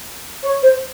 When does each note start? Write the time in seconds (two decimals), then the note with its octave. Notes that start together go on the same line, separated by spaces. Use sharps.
0.43 C#5
0.62 C5